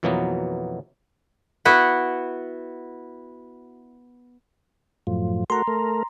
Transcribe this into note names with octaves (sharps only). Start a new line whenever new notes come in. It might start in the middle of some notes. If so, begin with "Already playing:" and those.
F2 B2 E3 F#3 A#3 B3
B3 E4 F#4 B4
F#2 A2 F3
A3 F#4 A#4 A#5 C6
A3 A#4